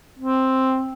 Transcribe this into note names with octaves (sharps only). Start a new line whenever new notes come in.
C4